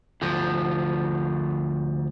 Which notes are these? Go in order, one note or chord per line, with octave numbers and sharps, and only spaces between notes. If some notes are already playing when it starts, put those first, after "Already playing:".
D2 F3